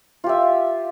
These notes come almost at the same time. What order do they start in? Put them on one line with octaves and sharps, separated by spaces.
F4 G4 E5